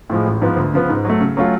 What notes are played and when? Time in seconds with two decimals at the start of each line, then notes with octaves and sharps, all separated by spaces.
0.10 A2 F3 G#3
0.25 A1
0.41 G#2 F3 B3
0.57 D2
0.73 C#3 F3 B3
0.89 G#2
1.05 F#3 A3
1.21 C#3
1.37 F#3 A3 C#4 F4